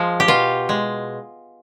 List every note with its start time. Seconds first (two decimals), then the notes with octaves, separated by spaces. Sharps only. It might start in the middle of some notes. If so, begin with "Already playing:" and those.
Already playing: F3 G#3
0.20 G4
0.28 B2 F4
0.69 G#3